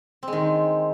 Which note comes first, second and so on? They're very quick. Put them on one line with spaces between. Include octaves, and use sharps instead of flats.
C4 G#3 D#3